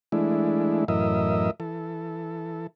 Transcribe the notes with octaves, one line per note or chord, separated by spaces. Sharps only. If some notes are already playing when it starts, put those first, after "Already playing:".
E3 G#3 A3 D4 E4
F#2 A2 E3 A#4 D#5 E5
E3 A4